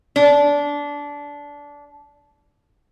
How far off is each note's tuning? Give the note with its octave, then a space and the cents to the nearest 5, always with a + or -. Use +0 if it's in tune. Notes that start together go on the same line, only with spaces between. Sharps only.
D4 -20